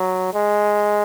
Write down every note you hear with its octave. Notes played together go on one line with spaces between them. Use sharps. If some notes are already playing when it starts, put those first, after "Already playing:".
Already playing: F#3
G#3